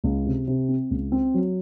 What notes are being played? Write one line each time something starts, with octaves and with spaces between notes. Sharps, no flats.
C#2
C3
C3
C4
C#2
C4
F#3